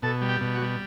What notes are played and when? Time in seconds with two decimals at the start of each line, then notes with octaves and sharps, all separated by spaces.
0.02 B2 A4
0.21 G3
0.29 G4
0.41 B2
0.55 F#4
0.61 G3